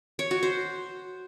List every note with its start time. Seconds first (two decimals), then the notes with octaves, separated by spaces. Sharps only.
0.19 C#5
0.31 F#4
0.43 C5